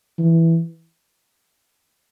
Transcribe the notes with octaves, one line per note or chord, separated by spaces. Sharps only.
E3